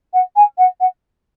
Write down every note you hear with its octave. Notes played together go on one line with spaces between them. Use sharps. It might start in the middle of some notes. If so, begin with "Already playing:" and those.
F#5
G#5
F#5
F#5